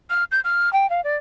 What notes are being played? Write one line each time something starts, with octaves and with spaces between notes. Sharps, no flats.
F6
G6
F6
G5
F5
D5